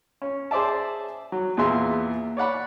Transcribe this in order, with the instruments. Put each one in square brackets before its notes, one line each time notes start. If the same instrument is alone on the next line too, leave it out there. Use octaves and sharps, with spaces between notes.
[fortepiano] C#4
G#4 C5 D5 E5 A5
F#3
E2 A#2 F4 G#4 E5 C6
C#5 D5 F#5 B5